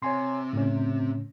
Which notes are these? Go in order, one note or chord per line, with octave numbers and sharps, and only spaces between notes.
C3 C#5 G#5 C6
A2 C#3 C#4